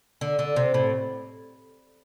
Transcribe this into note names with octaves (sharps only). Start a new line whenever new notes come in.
D3
D3
C3
A2